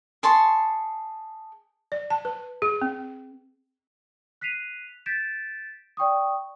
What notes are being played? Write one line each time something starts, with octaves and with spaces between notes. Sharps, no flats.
G#4 A5 C6 C#6
D5
A5
B4
G#4
C4
F#6 B6 C7 D#7 F7
G6 A6 B6 D7 E7
D5 G5 C#6 D#6